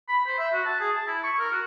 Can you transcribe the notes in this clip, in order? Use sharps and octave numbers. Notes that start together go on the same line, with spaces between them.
B5
C5
E5
F#4
A5
G#4
A5
E4
C#6
A#4
F#4